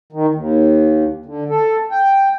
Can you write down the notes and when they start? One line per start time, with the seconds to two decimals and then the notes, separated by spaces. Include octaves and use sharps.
0.12 D#3
0.34 D#2
1.26 D3
1.49 A4
1.91 G5